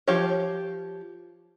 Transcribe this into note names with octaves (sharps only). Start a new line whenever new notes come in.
F3 G4 C#5